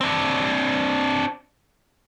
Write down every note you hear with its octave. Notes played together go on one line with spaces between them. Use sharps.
C4 D4